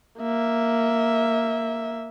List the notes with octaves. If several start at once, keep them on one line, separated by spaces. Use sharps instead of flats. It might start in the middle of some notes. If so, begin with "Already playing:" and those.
A#3 E5